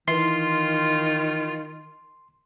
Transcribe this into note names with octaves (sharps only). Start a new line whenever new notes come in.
D#3 E3 F4 C6